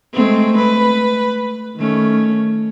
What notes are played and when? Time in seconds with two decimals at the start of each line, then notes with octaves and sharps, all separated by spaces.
0.14 G#3 A3 C4
0.57 B4
1.77 D#3 A3 C#4